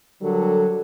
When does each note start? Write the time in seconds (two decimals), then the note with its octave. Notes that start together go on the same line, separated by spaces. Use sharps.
0.21 D3 F#3 G3 A4 A#4